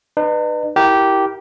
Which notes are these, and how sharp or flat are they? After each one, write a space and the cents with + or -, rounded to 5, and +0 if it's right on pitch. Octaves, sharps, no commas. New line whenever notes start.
D#4 -45 B4 +0
E4 -15 G4 -10 A#4 +0